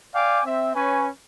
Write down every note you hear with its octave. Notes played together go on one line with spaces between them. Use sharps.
D5 F5 G5 G#5 D6
C4 E5
C#4 B4 C#5 G#5